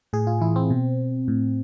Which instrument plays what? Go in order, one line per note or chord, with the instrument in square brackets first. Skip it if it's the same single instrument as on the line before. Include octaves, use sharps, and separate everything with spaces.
[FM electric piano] A2 G#4
F4
E3 E4
C4
B2
A2